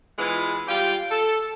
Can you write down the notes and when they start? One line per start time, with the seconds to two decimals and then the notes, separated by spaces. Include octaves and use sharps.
0.18 E3 G#3 B3 F4 G#4 B4
0.68 G3 F4 G5
1.11 A4